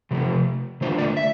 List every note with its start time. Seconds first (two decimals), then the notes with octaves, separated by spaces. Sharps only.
0.11 C3 F3 A3
0.81 D3 A3 D4 F4 C5
0.98 D5
1.17 E5